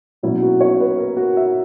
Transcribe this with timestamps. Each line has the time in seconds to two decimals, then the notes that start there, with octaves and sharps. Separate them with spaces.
0.23 B2 F#3 A#3 C#4 E4
0.43 F#4
0.61 C#5
0.80 B4
0.98 A#4
1.17 F#4
1.37 E5